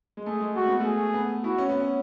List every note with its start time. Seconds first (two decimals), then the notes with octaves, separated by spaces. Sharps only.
0.17 G#3
0.26 A3 G#4
0.41 G#3
0.56 A3 F#4
0.68 B3
0.80 A3
0.86 G#4
1.14 B3
1.44 E4 F#4
1.58 C#4
1.69 B3
1.80 C#4